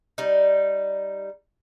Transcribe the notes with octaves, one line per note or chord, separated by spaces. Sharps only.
G3 D#4